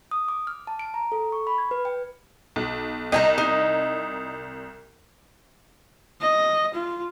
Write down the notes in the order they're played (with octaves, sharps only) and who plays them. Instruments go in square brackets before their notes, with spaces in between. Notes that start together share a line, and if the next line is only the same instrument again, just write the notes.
[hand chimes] D#6
D6
F6
A5
D7
A#5
A4
C#6
B5
G#6
B4
G5
[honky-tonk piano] B1
[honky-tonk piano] C2 [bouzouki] D#5 G5 A#5
[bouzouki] D#4
[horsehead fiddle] D#5
F4